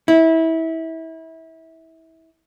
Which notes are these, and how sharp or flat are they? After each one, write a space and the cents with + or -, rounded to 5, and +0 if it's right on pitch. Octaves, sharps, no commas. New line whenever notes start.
E4 -25